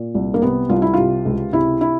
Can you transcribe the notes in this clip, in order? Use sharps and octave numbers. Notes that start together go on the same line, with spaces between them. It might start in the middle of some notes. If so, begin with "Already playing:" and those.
Already playing: A#2
C2
A#3
C3 B3
C2 F4
E4
C3 F4
C#2
C3 E4
E4